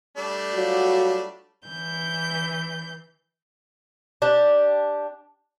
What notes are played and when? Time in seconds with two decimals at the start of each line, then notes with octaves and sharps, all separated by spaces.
0.17 G3 A3 D4
0.54 F#3 F4 F#4
1.67 E3 G6
4.22 D4 G4